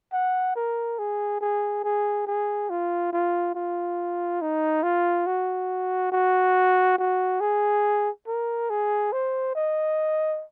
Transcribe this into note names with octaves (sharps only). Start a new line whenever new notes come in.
F#5
A#4
G#4
G#4
G#4
G#4
F4
F4
F4
D#4
F4
F#4
F#4
F#4
G#4
A#4
G#4
C5
D#5